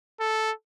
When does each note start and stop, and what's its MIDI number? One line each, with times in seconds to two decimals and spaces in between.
0.20 0.51 69